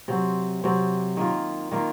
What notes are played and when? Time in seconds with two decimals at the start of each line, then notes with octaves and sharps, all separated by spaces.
0.08 C3 F#3 C4
0.64 C3 F#3 C4
1.17 D#3 A#3 F4
1.71 D#3 A#3 F4